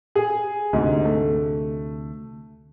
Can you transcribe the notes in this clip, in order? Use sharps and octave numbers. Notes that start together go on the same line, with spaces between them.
G#4
D2 G#2 C3
A3